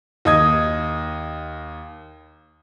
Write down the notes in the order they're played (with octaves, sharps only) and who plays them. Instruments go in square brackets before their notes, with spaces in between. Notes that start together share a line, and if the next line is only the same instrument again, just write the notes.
[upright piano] D#2 D#5 D#6 G#6